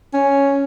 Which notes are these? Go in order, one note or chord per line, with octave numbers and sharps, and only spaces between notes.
C#4